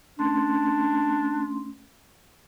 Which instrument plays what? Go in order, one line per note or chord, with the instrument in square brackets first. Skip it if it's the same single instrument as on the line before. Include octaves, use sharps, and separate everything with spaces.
[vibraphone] A3 C#4 C6 [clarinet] D4